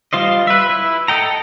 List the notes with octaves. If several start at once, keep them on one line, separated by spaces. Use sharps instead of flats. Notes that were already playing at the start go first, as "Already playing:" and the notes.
G3 F4 C5 D#5
B4 E5
E4
A4 D#5 G5 A#5